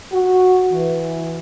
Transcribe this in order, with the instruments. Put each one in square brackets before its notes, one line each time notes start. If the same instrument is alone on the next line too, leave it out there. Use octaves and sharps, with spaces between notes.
[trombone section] F#4
E3